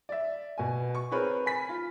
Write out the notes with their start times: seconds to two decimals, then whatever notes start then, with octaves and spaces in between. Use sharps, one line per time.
0.09 D5 E5
0.58 B2 G#5
0.95 C#6
1.11 C4 G#4 A#4 B4 C#5
1.46 G#5 B5 B6
1.69 F4